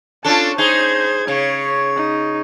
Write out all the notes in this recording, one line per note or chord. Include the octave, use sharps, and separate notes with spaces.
C#4 D4 F4 A4 A5
D#4 G#4 C5 G#6
C#3 C#5
D#4